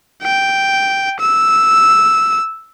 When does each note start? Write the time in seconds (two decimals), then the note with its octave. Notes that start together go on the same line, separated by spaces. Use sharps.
0.23 G5
1.20 E6